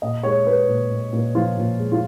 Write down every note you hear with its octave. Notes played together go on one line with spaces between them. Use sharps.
A#2 D#5
G#3 C#5
G#3 B4
A#2
A#2
A#2
F3 F4
A#2
G#3
F4